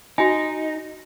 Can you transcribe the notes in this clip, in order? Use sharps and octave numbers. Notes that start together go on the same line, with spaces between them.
D#4 F#4 G#5